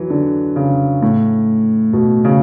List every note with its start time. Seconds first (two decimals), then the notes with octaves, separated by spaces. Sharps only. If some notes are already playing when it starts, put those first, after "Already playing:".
Already playing: E3 F#3
0.10 D3
0.56 C#3
1.02 A2
1.93 B2
2.25 C#3